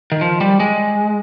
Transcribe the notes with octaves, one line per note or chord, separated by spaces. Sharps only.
D#3
F3
G3
G#3